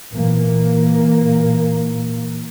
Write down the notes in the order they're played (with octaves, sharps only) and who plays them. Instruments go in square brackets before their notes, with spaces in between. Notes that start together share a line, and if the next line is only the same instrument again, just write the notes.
[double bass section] A#2 E3 A#3